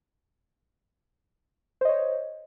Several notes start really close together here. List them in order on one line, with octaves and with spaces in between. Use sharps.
C5 D#5 C#5